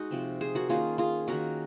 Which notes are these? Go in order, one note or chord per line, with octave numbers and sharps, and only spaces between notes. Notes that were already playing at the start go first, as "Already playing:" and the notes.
Already playing: G#3 D#4 F#4
C3 F3 C4
G#4 C5
F#4 A#4
D#3 A#3 C#4 F4 G#4
F4 G#4
D#3 A#3 C#4 F#4 A#4